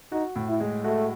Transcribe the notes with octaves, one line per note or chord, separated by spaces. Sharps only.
D#4 F#4
A2
E4
G#3
A3 F#4